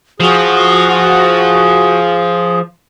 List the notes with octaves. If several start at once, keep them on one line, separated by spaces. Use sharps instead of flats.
F3 F#4 G#4